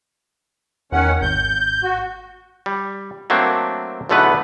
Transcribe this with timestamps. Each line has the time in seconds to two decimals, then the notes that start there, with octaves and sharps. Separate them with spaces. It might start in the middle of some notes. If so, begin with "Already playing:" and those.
0.92 E2 D#3 C#4 F#5
1.22 G#1 G6
1.83 F#4
2.66 G3
3.30 F#3 A3 A#3 C4 D4
4.09 B1 E2 D3 A3 B3 B4